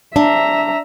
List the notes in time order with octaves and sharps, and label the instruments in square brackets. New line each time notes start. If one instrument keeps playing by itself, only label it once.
[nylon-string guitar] D4 [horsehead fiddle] E5 A#5